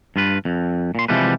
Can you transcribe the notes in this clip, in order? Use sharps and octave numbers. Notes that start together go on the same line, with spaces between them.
G2 F4 B4
F2
A#2 C6
C3 E3 F3 G3 G#3 B4